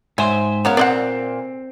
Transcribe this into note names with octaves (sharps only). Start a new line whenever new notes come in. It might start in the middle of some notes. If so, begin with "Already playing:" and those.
G#2 F#3 C5 C#5 E5 G5 G#5
C#3 B3 A#4 C#5 F5
A#2 C4 D5 D#5 F#5